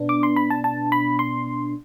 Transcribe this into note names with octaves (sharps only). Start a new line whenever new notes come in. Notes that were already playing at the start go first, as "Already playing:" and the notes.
Already playing: B2 B3 D4
D6
C6
B5
A5
A5
B5
C6